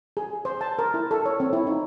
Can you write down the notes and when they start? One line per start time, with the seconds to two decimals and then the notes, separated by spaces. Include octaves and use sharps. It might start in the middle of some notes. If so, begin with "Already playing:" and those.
0.17 G#4
0.45 C5
0.61 A5
0.79 A#4
0.94 E4
1.11 A4
1.25 C#5
1.40 C4
1.53 E4
1.67 D#4